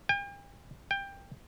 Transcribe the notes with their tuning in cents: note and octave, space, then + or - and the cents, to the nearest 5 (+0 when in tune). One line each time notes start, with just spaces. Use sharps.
G5 +40
G5 +15